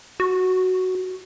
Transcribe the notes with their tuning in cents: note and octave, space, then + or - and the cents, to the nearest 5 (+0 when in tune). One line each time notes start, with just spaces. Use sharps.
F#4 +5